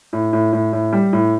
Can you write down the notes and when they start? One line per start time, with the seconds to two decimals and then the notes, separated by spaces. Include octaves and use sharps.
0.13 A2
0.33 A2
0.53 A2
0.73 A2
0.93 G3
1.13 A2